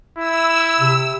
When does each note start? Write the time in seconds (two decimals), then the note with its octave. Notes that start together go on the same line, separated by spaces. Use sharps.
0.19 E4 E6
0.80 C3